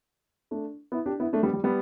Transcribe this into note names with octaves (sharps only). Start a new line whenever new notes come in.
A3 D4
B3 E4
D4 G4
B3 E4
A3 D4
G3 B3
G3
G3 B3